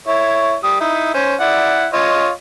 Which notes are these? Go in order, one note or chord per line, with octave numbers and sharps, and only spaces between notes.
E4 C#5
G3 D#6
D#4 E4
C#4 C5
E4 D5 F#5
F4 C#5 D#5